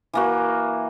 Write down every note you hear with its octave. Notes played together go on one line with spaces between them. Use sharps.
E3 A#3 F#4